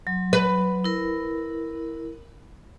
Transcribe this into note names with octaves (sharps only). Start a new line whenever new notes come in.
F#3
B4
E4 A#4